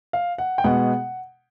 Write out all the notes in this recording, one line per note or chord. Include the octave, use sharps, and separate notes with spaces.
F5
F#5
G5
B2 G#3 B3 F#5